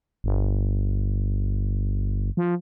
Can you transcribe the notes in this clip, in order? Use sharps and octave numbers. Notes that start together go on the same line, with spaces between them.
G1
F3